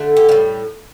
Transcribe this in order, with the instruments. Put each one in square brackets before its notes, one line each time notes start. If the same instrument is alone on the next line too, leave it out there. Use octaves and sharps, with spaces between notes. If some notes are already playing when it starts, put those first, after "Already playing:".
Already playing: [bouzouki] D3 A3
G4
A2 G3 F4